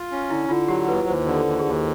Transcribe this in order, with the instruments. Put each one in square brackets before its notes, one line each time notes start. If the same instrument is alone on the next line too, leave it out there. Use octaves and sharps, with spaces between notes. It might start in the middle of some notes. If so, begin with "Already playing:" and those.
Already playing: [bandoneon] F4
C#4
[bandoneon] D3 [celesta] E4
[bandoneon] D3 [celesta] F4
[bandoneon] F#3 [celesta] G4
[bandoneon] D#2 [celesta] B4
[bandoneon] D#2 [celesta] C5
[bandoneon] D3
[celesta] A4
[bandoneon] D#2
[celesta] G#4
[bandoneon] D#2